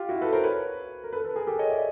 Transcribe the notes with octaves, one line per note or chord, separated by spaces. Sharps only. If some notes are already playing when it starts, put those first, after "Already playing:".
Already playing: F4 G4
E4 F#4
A4 B4
A#4 C5
B4 C#5
A#4
A4 B4
A4 B4
G#4 A#4
G4 A4
C#5 D#5
D5 E5